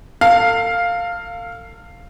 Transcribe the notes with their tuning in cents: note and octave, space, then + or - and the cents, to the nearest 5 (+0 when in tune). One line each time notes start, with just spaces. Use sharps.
A4 +40 F5 +0